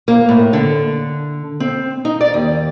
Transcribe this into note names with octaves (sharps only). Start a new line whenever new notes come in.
A#3
A2
D3
C4
D#4
D5
D#2